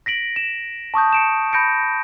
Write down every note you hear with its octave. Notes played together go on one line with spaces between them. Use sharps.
A#6 B6 D7 F#7
E7
A5 C#6 D#6 G6
C#7 D7 E7
B5 G6 A#6 C#7 D7